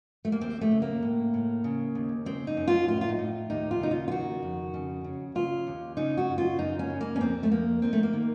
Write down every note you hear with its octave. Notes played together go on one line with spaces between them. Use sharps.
A3
A#3
D#2 C4
A3
C#3
A#3
A2
A2
C#3
D#2
C#3 C4
D#4
F#2
F4
A2 F4
F4
D#4
A2
D#2 D#4
F4
C#3 D#4
F4
F4
D#3 F#4
F2
C#3
C#3
C#3 F4
D#2
C#3 D#4
F#4
F#2
F4
F#2 D#4
C#4
C#3
A#3
C#4
F2 C4
A3
F2 A#3
D#3 C4
A3
A#3
D#3